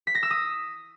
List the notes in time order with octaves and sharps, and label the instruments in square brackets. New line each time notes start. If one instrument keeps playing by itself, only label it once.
[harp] B6
A#6
E6
D#6